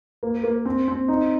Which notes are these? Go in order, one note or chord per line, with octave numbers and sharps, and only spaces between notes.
A#3
A#3
C4
C4
D#4